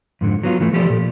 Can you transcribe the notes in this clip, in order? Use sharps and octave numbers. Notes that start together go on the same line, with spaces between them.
F2 G#2 D3
F#3 B3 F4
E3 A3
F3 G4 A4 D5
A#2